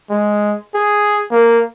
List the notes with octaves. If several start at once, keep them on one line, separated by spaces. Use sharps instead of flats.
G#3
G#4
A#3